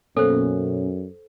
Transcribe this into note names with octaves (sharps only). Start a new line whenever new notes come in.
F#2 B2 A#3 C#4 A4 C5